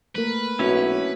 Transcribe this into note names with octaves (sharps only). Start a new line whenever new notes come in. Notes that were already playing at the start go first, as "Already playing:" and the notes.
A3 A#3 A#4 B4
B1 C4 C#4 E4 F#4 A#4